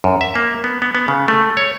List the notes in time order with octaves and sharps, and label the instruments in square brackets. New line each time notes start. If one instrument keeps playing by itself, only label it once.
[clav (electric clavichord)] F#2
E5
A#3
B3
B3
B3
C#3
A3
C#5